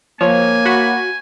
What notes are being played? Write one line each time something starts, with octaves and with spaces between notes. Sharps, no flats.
F3 A#3 C#5 G#5
F#4 B5